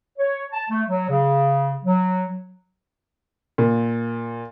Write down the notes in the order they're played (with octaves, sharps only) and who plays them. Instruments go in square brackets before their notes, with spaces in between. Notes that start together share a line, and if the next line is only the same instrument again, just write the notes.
[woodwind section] C#5
A5
A3
F#3
C#3
F#3
[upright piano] A#2